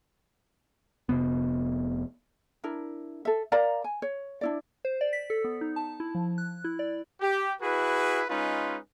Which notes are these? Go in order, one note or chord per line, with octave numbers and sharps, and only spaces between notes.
F1 G#2 C3 B3
D4 E4 A#4
A4 E5
A#4 D5 F5 A#5
G#5
C#5
D4 E4 D5
C5
D5
B6
A4
B3
D#4
A5
E4
F3
F#6
E4
D5
G4
E4 F#4 G#4 B4
G#3 C#4 D#4 F4 B4